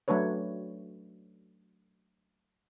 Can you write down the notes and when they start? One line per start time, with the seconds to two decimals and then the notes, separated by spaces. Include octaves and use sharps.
0.08 F#3 A3 D4 B4 C#5